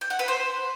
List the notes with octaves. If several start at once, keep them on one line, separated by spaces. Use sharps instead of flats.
G5
F#5
B4
C5